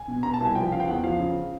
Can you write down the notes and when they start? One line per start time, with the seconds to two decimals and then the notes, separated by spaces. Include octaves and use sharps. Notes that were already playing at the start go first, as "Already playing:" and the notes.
Already playing: G#5
0.08 B2
0.23 B2 A#5
0.34 A5
0.40 C2 G#5
0.55 F3 G5
0.72 C#3 F5
0.80 G5
0.88 E2 F#5
1.04 F3 F5
1.20 C#3